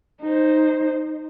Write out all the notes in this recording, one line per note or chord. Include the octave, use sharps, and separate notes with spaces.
D#4 C5